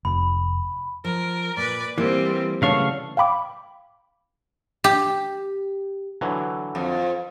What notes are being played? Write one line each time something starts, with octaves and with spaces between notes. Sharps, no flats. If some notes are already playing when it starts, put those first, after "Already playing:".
F1 B5
F3 A#4
A#2 B4 D5
E3 G3 A#3 C4
C#3 E3 F#3 A3 D4 F5 C#6
F5 G5 B5 D6
G4
D3 E3 F#3
F2